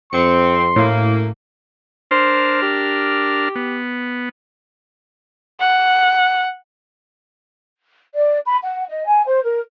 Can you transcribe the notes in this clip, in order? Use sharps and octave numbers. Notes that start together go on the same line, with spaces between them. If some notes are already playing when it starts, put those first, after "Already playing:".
F2 C4 C6 C#7
F#2 A2 A3 A#3
D4 A#4 C5 F6
G4
B3
F#5
D5
B5
F#5
D#5
G#5
C5
A#4